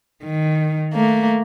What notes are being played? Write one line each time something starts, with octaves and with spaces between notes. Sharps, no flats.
D#3
A3 A#3